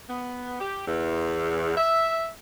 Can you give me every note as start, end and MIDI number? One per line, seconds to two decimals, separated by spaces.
0.09 0.58 59
0.61 0.84 67
0.87 1.75 40
1.77 2.28 76